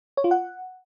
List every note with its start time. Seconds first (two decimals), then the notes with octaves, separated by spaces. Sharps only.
0.17 C#5
0.24 F4
0.31 F#5